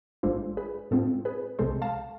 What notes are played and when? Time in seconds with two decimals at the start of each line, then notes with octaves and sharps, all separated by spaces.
0.23 A1 G#2 G#3 D4 F4 A4 C5
0.57 G#4 B4
0.91 A2 G#3 C4 F4 A4
1.25 G#4 B4
1.59 C2 C3 G#3 A4 C5
1.82 F5 A5